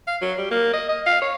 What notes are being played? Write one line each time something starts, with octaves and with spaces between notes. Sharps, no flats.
F5
F#3
G3
A#3
D#5
D#5
F5
C#5